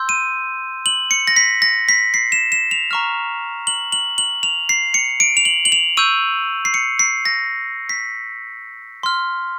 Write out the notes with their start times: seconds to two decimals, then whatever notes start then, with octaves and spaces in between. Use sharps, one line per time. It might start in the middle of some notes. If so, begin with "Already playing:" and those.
Already playing: C6 E6 G6
0.09 D#7
0.86 F#7
1.11 C#7
1.27 A#6
1.36 B6
1.62 A#6
1.89 B6
2.14 C7
2.32 E7
2.52 E7
2.71 F7
2.91 A#5 C#6 F6
3.67 F#7
3.92 F#7
4.18 F#7
4.43 F7
4.69 C7
4.94 C#7
5.20 D7
5.37 F7
5.45 F#7
5.65 F#7
5.72 F7
5.97 C#6 E6 G6 D#7
6.65 C7
6.74 C#7
6.99 C7
7.25 A#6
7.89 B6
9.03 C6 F6